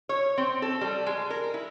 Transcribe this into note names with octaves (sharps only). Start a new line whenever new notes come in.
C#5
C4
A4
G3
G#3
A#4
E4